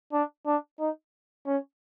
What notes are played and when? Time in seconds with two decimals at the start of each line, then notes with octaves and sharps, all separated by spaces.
0.12 D4
0.46 D4
0.80 D#4
1.47 C#4